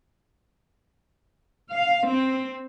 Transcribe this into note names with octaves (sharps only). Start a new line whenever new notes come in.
F5
C4